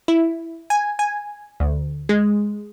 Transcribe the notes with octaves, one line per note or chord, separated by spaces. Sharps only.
E4
G#5
G#5
D2
G#3